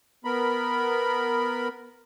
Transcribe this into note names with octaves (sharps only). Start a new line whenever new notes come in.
B3 A#4 B5